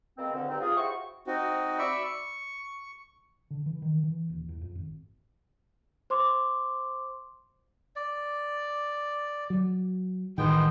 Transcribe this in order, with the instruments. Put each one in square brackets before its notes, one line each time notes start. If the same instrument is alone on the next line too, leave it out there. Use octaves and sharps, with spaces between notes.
[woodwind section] B2 G#3 A#3 C4
D2 D3
G2 C4 D#4
F4 G#4
E4 F#4 G4 C5 C#6
[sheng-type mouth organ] C4 D#4 F#4
D5 E5 B5 C#6
C#6
[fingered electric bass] D3
E3
D#3
E3
D#1
E2
F2
G#1
[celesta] C5 C6 D6
[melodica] D5
[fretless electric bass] F#3
[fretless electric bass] A1 D#3 [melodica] G#3 B3 G5